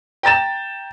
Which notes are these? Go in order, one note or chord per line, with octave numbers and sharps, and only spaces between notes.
G5 A#5 A6 E7